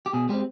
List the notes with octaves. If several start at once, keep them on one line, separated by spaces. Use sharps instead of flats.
G4
B2 G#4
G#3 C4 G4